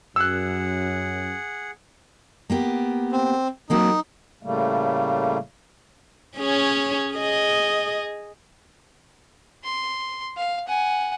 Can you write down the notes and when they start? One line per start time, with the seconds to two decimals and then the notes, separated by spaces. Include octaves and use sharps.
0.16 F#2 G#4 F#5 E6 F#6
2.50 A#3 B3 G4
3.12 C4
3.70 F#3 A#3 C4 D#4
4.43 A2 C#3 G3 A3 A#3
6.38 C#4 G#4 C#5
7.14 G#4 D#5
9.64 C6
10.37 F5
10.68 F#5 G#5